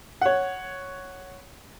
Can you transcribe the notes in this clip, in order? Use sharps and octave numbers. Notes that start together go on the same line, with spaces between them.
C#5 F#5